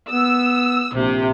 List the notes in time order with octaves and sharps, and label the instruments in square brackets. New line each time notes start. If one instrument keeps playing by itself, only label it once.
[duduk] B3 [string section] E6
[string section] A#1 C3